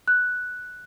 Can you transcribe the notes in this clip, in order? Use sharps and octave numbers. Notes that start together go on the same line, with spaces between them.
F#6